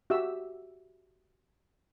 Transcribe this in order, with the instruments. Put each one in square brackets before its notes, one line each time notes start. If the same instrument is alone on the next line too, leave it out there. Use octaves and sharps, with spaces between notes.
[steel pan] F#4 G4 E5 E6